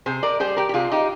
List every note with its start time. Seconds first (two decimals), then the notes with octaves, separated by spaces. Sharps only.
0.06 C3 G#4 C5
0.23 A#4 D5
0.40 G3 G#4 C5
0.57 G4 A#4
0.69 G4
0.74 C3 F4 G#4
0.91 D#4 G4